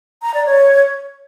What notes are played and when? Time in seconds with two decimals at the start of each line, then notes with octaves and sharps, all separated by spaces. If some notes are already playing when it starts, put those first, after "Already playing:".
0.22 A#5
0.34 D5
0.46 C#5